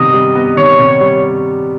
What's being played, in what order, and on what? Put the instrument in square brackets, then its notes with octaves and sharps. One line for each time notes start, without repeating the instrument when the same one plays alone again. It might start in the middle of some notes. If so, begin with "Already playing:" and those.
Already playing: [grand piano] C3 D#3 G3 B3 [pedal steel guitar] D#5
[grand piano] G3
B3
[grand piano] D#3 [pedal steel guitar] C#5
[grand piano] C3
G3